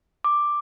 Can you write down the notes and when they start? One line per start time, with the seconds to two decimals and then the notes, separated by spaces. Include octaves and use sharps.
0.24 D6